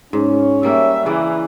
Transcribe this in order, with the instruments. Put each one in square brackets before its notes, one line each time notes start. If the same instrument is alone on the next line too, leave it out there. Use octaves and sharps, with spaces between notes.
[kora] G#2 [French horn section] C#4
[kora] G3 A#3 [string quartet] E5
[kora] C#3 A#3 D5 [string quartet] E3